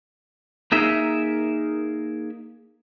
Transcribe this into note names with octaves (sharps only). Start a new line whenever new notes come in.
A#3 D#4 G#4 A#4 E5